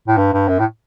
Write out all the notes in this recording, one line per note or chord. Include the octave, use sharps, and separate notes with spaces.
A2
G2
G2
F#2
A2